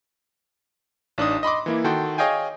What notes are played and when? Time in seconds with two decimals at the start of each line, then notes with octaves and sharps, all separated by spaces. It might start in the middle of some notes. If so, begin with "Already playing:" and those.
1.18 A1 D4 D#4 D#6
1.43 D#5 B5 C6 D6
1.66 E3 A#3 E4
1.84 D#3 F#4 A4 G5 C6
2.18 G#4 C#5 D#5 F5 G5 G#5